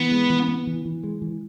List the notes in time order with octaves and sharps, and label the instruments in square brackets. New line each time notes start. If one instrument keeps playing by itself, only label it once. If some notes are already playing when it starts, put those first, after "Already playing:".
Already playing: [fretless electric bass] E3 [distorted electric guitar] B3
[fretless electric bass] G#3
E3
B3
E3
E3
G#3
E3